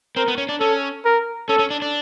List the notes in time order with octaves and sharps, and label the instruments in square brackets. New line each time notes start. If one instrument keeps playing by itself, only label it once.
[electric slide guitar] C4 [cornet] A#4
[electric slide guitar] B3
C#4
D4
[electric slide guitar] C#4 [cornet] A4
[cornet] A#4
[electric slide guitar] C#4 [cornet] A4
[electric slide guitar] C#4
D4
D4